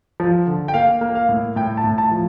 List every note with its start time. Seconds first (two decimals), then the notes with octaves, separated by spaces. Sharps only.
0.20 F3
0.47 D3
0.68 G5
0.74 A#3 F5
1.01 A#3
1.15 F5
1.29 A2
1.56 A2 G5
1.77 A5
1.84 A2
1.98 A5
2.11 F3